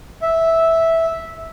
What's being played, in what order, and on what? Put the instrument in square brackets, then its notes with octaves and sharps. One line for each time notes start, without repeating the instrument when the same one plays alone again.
[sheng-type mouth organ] E5